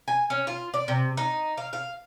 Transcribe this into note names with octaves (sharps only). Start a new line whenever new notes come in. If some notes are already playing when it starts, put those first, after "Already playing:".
G#5
C#4
F4
D5
C3
D#4
F5
F5